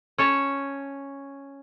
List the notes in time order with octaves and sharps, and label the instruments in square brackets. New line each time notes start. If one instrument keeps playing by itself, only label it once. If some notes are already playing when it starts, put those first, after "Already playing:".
[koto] C#4 C#5 A5